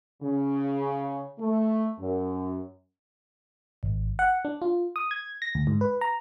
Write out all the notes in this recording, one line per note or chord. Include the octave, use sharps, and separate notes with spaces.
C#3
A3
F#2
G#1
F#5
D4
F4
D#6
G#6
A#6
D2
G#2
B4
A#5